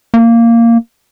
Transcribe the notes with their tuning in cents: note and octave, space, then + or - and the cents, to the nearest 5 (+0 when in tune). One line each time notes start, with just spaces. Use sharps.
A#3 -10